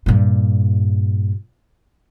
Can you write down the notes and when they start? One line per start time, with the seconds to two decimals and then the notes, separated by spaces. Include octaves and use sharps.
0.06 G2 A#2